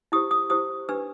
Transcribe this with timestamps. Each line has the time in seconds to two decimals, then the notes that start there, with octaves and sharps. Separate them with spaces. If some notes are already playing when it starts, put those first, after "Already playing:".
0.12 E4 G4 C5 D#6
0.31 D#6
0.50 E4 G4 C5 D#6
0.89 D4 G4 B4 E6